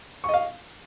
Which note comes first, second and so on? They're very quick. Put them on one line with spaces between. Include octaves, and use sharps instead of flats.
C#6 D#5 F5